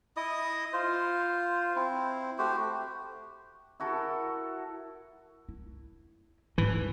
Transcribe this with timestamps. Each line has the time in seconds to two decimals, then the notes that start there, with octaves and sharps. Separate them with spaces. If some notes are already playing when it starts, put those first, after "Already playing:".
0.17 E4 D#5 D#6
0.73 F4 C5
1.76 C4 E4
2.38 A3 F#4 G4 C5
3.80 E4 F#4 A4 A#4
5.49 E4
6.58 G#2 E3